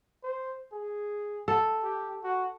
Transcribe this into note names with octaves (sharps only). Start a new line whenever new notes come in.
C5
G#4
A4
G4
F#4